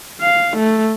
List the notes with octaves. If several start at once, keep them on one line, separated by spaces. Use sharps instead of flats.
F5
A3